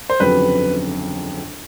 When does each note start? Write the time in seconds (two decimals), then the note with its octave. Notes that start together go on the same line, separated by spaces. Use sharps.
0.10 C5
0.20 G1 F2 C#3 F#3 B4